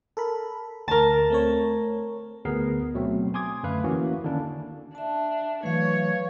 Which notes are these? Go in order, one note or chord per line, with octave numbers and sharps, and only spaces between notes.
A4 A#4 B5
D2 A#4 A5
A3 C4 C#5
D2 B3 G#4 A#4 C7
B2 F#3 A3 C4
G#5 C6 D6 D#6 G#6
F#2 D3 A3 B4 F5
E3 A#3 C#4 E4 F#4
D3 D#3 A#3 C#4 D4 E4
D4 E5 A5
E3 F#3 A3 B4 C#5 F5